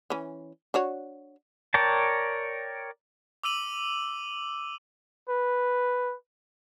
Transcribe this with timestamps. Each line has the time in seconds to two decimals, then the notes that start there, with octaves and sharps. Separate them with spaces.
0.10 E3 C#4
0.74 D4 F#4 C#5
1.74 A#4 C#5 D5 G5 A5
3.43 D6 E6 D#7 F#7
5.29 B4